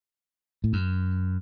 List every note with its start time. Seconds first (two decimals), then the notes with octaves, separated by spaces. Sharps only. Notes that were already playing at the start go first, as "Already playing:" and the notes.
0.64 A2
0.73 F#2